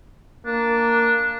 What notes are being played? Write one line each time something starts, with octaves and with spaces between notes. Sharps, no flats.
A#3 D4